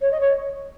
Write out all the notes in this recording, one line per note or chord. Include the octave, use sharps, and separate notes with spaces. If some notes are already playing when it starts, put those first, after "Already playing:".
C#5
D#5
C#5